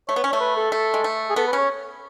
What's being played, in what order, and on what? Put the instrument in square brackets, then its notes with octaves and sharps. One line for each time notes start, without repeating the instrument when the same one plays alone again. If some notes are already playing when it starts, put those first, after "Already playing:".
[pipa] A3 [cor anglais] C#5
[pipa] B3
C#4
[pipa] A3 [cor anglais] C#5
[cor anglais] B4
A4
[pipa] A3 [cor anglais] A4
[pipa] G#3
A3
[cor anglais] G#4
[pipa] B3 [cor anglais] A4
[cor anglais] B4
[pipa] C#4
[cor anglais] C#5